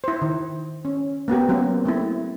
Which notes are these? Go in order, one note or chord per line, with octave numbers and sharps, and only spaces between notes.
E4 C5
D#3
C#4
A#3 B3 F#4 G4
F#3 A#3 C4 C#4 F#4 G4
A3 C4 E4